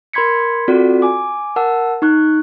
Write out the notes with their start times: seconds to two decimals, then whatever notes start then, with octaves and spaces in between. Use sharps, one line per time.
0.13 A#4 B5 C6 G#6 B6 C#7
0.68 C4 F4 F#4 A4 D5
1.02 G#5 D6
1.56 A#4 F#5 A5 E6
2.02 D#4 C#6 F#6